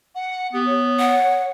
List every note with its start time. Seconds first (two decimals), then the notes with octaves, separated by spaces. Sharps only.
0.15 F#5
0.53 B3 G4
0.66 C#5
0.99 F#5